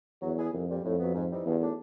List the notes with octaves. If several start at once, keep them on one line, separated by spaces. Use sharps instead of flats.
E2 F#3
B3 E4 G#4
C2 F2
A#2 G3
F2 A2
F#3 B3
G#2
E3 G3 C4 D#4
E2 G2
D#3 F#3 A3 D4